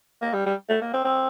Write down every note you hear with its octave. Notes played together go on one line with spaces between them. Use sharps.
A#3
G3
G3
A3
A#3
C4
C4